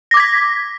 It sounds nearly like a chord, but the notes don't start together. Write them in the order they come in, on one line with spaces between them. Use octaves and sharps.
A#6 D6 G#6 B6